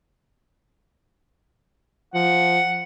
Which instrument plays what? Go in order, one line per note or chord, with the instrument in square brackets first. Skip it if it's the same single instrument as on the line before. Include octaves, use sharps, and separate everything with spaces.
[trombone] F3 [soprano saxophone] F#5